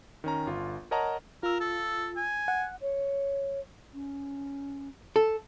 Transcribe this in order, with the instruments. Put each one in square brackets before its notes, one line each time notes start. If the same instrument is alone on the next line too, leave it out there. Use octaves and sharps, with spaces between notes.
[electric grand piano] D#3 C#4 A#5
G1 F4
A#4 C#5 D#5 F#5 A5 A#5
[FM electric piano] F4 E6 [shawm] A#4
[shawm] A4
G#5
[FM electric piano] F#5
[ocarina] C#5
C#4
[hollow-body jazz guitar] A4